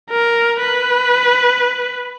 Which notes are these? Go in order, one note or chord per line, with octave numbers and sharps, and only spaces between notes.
A#4
B4